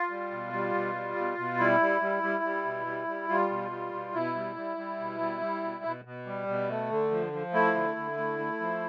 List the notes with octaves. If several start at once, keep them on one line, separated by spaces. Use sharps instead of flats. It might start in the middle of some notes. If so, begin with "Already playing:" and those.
Already playing: F4
G3
B2
G3
B2
G3
B2
B2
G3 E4
G3
G3
G3
G3
B2
G3
G3
G3 F4
B2
G3
B2
B2 E4
G3
G3
G3
B2
G3
G3
B2
B2
B2
G3
B2
A3
D3
F3
F3
A3 E4
D3
D3
A3
A3
F3